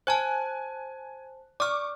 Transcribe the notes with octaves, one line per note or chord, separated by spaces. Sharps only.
C5 G#5 A5 F#6
D5 C#6 D6 F6